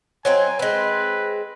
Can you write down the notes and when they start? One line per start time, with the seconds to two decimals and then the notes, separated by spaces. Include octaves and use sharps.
0.25 F#3 C4 D#4 G#5
0.59 G#3 C4 B4